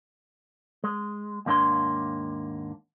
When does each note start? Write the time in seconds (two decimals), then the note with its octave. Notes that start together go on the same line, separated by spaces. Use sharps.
0.84 G#3
1.46 D#2 G#2 A#3 D4 C#5 C6